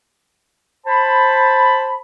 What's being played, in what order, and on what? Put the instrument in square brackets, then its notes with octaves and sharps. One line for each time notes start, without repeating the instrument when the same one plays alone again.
[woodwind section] C5 A5 B5